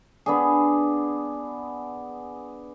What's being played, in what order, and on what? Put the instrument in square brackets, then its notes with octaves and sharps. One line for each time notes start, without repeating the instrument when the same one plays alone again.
[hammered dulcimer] B3 D4 G#4